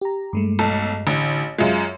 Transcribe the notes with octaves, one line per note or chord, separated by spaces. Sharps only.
G4 A#5
G2 G#3 A3
B1 A4
A1 D3
F#2 G#3 F4 E5 F5